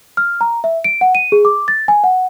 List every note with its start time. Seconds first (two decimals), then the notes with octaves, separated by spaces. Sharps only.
0.17 F6
0.41 A#5
0.64 E5
0.84 D7
1.01 F#5
1.15 D#7
1.32 G#4
1.45 D6
1.68 A6
1.88 G#5
2.04 F#5